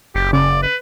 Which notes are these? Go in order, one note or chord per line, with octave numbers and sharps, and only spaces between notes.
F#1 G4
C#3 D5
B4